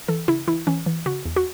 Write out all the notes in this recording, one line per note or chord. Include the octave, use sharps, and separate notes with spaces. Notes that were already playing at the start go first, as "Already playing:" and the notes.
E3 A4
C#3 E4
E3 E4
E3 C#4
E3
C#3 F#4
E2
F#4